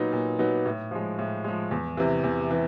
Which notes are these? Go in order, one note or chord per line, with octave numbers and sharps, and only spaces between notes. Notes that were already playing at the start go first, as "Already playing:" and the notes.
Already playing: A#2 F#3 B3 D#4
A#2
F#3 B3 D#4
A2
F3 G#3
A2
F3 G#3
E2
C3 E3
E2
C3 E3